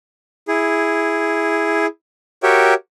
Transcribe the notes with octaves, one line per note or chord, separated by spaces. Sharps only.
E4 G#4
F#4 G4 A#4 C#5 E5 G5